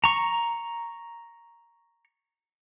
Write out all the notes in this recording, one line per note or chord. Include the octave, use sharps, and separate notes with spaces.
A#5 C#6